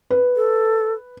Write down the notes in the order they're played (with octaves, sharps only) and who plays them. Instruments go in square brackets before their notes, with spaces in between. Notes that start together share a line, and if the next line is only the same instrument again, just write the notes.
[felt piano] B4
[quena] A4